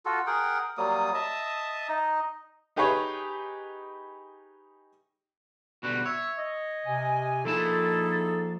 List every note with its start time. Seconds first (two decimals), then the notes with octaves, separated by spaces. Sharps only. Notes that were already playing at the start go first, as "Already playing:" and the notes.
0.06 F4 F#4 A4
0.27 G#4 A#4 F#5 G5
0.78 F#3 G3 A#3 D#6
1.14 D#5 E5 A5 D#6
1.89 D#4 D#5
2.76 D#4 G4 G#4 B4 C#5
5.83 B2 D3 G3 F#4
6.05 C#5 E5
6.38 D#5
6.86 C3 G#5
7.45 F3 A#3 D#4 E4 G#4 A4 A5